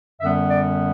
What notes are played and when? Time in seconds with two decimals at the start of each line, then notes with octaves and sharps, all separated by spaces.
0.21 F#2 D3 G3 B3 E5
0.51 D5